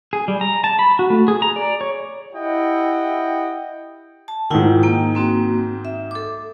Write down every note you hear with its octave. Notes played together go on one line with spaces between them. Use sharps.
G#4
G3
A#5
A5
B5
F#4
A3
G#4
A#5
D5
C#5
E4 G4 D#5 F#5 G5
A5
G#2 D#3 E4 F4 F#5
A#3 G5
A#3 C4 F#4
E5
A4 D6